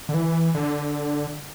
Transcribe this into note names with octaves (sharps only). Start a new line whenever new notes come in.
D3
E3
D3